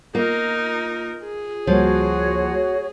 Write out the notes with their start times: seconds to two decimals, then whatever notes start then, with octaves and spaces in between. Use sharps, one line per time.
0.15 A#3 D#4 F4 A#4
1.23 G#4
1.67 C#2 F3 G3 A#3 F#4 C#5